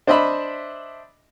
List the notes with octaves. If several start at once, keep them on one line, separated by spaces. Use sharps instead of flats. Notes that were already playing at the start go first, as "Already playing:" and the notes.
D4 C5 D#5 E5 B5